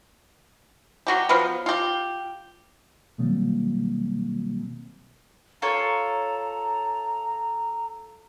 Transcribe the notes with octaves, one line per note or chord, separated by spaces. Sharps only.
F#3 F#4 G4
F3 F#3 B3
F4 G4
B2 D#3 F#3 G3 A#3 C4
F4 A4 C#5 A#5